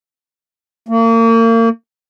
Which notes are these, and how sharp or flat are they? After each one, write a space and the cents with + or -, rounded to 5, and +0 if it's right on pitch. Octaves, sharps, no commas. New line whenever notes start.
A#3 -35